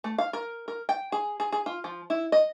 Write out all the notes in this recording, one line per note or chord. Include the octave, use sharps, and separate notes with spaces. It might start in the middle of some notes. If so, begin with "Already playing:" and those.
A3
F5
A#4
A#4
G5
G#4
G#4
G#4
F4
F3
E4
D#5